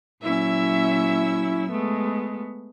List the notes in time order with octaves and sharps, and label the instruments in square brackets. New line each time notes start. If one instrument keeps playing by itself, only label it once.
[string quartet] A#2 F#3 C#4 E4 E5 E6
G#3 A3 B3